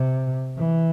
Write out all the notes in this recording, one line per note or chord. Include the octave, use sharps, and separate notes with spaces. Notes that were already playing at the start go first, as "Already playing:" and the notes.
Already playing: C3
E3